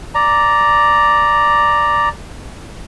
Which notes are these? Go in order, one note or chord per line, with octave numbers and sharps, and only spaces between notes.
D5 A#5